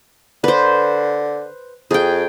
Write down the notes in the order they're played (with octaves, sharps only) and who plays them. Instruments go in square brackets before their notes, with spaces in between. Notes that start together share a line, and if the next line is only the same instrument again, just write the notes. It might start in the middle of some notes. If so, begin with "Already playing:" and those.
[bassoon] D3 [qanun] B4 C5
[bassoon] F2 [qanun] G#4 G5